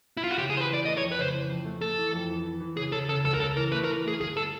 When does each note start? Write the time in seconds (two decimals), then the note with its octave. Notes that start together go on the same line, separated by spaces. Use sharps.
0.17 E4
0.24 F4
0.31 F#4
0.38 C#3 G4
0.50 G#4
0.54 E3 C5
0.61 B4
0.69 E3 D5
0.85 A3 D#5
0.97 C#5
1.02 F2
1.12 B4
1.17 C#3 C5
1.34 E3
1.49 F2
1.65 A3
1.81 A3 A4
1.97 E3
2.13 F2
2.30 E3
2.44 E3
2.60 E3
2.77 C#3 G#4
2.92 C#3 A4
3.09 C#3 A4
3.25 C#2 A4
3.34 A#4
3.40 C#3 A4
3.56 E3 A#4
3.72 A3 B4
3.84 A#4
3.89 E3
4.05 A3 G#4
4.20 G1 G#4
4.37 A4